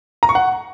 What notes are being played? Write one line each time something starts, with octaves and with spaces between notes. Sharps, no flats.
A#5
C#6
F#5